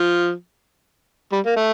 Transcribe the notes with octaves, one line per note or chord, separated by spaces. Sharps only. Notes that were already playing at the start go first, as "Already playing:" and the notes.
Already playing: F3
G3
A#3
A3